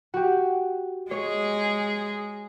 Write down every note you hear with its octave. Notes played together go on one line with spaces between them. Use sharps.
F#4 G4
G#3 G#4 C#5